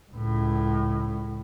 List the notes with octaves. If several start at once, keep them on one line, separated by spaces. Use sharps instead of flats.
C#2 A2